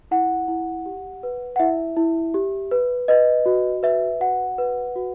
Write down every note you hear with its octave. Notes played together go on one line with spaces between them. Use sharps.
E4 F#5
E4
G4
B4
F#5
E4 E5
E4
G4
B4
B4 D#5
F#4
B4 E5
F#4 F#5
B4
F#4